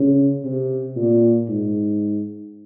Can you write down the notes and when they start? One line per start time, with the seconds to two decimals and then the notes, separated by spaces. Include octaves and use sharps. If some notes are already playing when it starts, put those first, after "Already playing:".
Already playing: C#3
0.44 C3
0.96 A#2
1.48 G#2